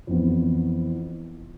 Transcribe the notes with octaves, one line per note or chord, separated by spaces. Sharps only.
F2 E3 B3